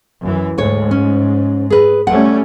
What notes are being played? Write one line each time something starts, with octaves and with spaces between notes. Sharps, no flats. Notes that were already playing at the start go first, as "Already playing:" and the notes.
F#2 E3
D2 G#2 C#5
C#4
G#4 B4
G3 A3 C#4 F#5